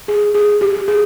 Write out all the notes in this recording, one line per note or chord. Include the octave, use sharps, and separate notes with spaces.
G#4
G#4
G4
G#4